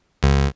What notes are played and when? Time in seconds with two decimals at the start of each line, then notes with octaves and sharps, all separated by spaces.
0.23 C#2